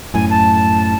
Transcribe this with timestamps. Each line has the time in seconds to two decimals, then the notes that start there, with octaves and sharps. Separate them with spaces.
0.14 F#2 A2 G#5
0.30 A5